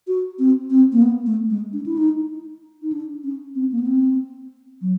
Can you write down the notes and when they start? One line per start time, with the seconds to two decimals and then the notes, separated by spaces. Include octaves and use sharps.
0.08 F#4
0.39 C4
0.70 C4
0.92 A#3
1.02 B3
1.26 A3
1.50 G#3
1.73 D4
1.86 E4
1.98 D#4
2.82 D#4
2.92 D4
3.24 C#4
3.55 C4
3.72 A#3
3.79 B3
3.87 C4
4.81 F#3